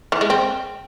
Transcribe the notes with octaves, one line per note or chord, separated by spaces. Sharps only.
E3
G#3
C4